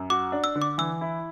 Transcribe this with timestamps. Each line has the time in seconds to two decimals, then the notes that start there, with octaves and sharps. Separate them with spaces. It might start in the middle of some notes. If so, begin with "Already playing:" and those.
Already playing: F#2
0.10 F#4 D6
0.32 D4
0.44 E6
0.55 D3
0.62 D6
0.78 E3 E6
1.01 E4